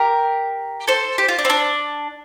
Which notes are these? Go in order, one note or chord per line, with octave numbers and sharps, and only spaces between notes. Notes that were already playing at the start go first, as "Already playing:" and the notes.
Already playing: G4 A#4
A4 C5
G4
F4
D4
C4
D4